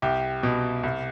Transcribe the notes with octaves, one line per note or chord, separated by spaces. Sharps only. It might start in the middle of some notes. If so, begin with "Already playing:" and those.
C2 G4
B2
C2